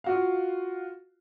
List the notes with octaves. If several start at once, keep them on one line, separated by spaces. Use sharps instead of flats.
F4 F#4 F5